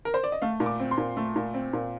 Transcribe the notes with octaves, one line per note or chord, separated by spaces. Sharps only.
A#4
C5
D5
D#5
A3 F5
A#2
D6
C4
C6
A#2
A3
A#2
C4
A#2